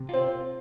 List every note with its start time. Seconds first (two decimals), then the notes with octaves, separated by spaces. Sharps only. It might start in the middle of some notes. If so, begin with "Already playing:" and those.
Already playing: C3
0.09 C4 F4